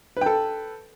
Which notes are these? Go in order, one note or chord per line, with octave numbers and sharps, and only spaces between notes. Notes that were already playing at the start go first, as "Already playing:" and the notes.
A4 B4 G5